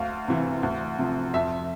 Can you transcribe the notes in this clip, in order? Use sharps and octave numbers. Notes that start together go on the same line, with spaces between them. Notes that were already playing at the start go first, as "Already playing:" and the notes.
Already playing: D2 F5
C3 E3
D2
C3 F3
F2 E5